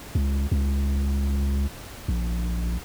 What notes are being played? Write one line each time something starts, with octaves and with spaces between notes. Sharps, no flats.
C#2
C#2
A#1